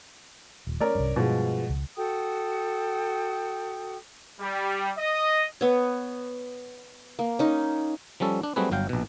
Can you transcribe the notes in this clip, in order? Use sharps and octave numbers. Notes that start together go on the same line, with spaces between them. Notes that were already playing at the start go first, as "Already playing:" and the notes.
D#1
A3 C#4 A#4 D5
C2 G2
G2 B2 F3 G#3
C#2
F#4 A4 G5 D#6
G3
D#5
B3 C#5
A#3
C#4 D#4
F3 G3 C#4 A4
D4
F#3 G3 A3 C4 G#4 B4
G1 F#3 F5 G5
A#1 B2